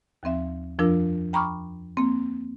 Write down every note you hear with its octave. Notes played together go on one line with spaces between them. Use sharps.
D#2 F3 C4 E5
F2 F3 D4 F4 A#4 E6
G5 A#5 B5 C#6 D6 F6
A#3 C4